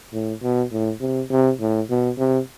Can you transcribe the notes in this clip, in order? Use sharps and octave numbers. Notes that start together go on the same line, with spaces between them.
A2
B2
A2
C3
C3
A2
B2
C3